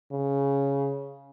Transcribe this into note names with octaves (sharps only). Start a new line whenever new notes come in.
C#3